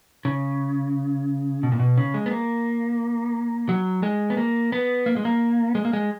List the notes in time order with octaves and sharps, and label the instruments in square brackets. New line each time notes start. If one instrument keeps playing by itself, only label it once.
[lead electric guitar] C#3
B2
A#2
B2
C#3
G#3
B3
A#3
F#3
G#3
B3
A#3
B3
A#3
G#3
A#3
G#3
A#3
G#3